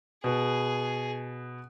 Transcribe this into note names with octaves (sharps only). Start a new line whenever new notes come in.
B2 B3 G#4